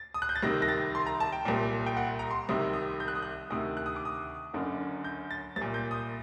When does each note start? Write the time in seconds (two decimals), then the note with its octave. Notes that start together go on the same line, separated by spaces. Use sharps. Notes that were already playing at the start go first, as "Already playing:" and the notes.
Already playing: A6
0.14 D#6
0.22 F#6
0.29 G6
0.36 A6
0.43 C2 C3 D#3 A#6
0.62 A#6
0.68 A6
0.95 C6
1.06 A#5
1.20 A5
1.32 G5
1.45 C2 A#2
1.86 G5
1.97 F#5
2.19 A#5
2.31 C6
2.49 C2 C3 D#3 D#6
2.73 D#6
3.00 G6
3.08 F#6
3.15 D#6
3.22 F#6
3.50 D2 C3 D#3 D#6
3.77 F#6
3.86 D#6
3.96 D6
4.05 D#6
4.54 F#1 F#2 D3
5.04 G6
5.31 A6
5.56 C2 A6
5.61 A#2
5.74 G6
5.91 D#6